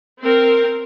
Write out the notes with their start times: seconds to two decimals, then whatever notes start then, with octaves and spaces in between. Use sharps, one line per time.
0.22 C4 A#4